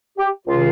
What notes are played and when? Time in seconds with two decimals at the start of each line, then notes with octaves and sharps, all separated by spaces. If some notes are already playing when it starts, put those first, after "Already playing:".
0.18 G4
0.46 C#2 C3 D#3 F4